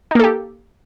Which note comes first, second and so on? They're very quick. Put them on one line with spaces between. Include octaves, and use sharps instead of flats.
D#4 A#3 A4 G4